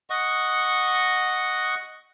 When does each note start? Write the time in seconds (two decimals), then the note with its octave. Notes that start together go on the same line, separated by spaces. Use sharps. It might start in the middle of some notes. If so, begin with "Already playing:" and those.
0.10 D#5 F#5 C#6